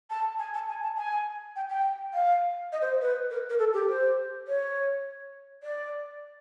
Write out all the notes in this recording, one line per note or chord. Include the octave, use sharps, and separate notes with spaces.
A5
G#5
A5
G#5
A5
G#5
G5
G5
F5
D#5
C5
B4
A#4
A#4
A4
G4
C5
C#5
D5